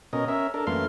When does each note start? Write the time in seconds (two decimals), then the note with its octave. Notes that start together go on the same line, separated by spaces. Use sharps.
0.13 B2 C#4 A#4 D#5
0.28 C#4 A#4 E5
0.54 D4 A4 A#4
0.67 F#2 E3 A3 A#3 F5 C6